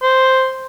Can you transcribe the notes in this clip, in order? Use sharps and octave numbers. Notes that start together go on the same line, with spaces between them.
C5